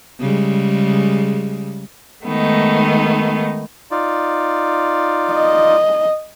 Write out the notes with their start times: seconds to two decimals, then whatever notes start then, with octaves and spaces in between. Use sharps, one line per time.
0.20 C#3 G3 G#3
2.25 D#3 G#3 A3 B3 D#4
3.91 D#4 F4 D5
5.33 D#5